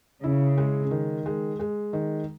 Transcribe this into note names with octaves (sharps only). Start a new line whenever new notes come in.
C#3 E4
G#3
D#3
G#3
G#3
D#3